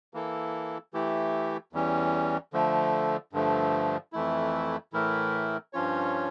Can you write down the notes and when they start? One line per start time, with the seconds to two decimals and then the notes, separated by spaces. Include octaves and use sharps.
0.14 E3 A#3 E4 A4
0.93 E3 A3 E4 G4
1.73 E2 E3 G3 C#4
2.53 D3 F3 A3
3.33 G2 D3 F3 A3
4.13 F2 E3 A3 E4
4.93 A2 E3 A3 E4 A#4
5.73 G2 F3 C#4 F4 C#5